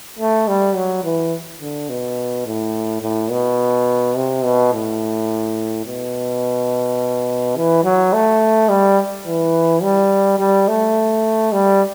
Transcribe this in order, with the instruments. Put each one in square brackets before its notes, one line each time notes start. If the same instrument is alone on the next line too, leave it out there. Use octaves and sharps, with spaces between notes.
[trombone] A3
G3
F#3
E3
D3
B2
A2
A2
B2
C3
B2
A2
B2
E3
F#3
A3
G3
E3
G3
G3
A3
G3